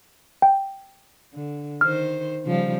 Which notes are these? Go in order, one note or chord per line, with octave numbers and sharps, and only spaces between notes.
G5
D3
D#3 C5 F6
C#3 F3 G3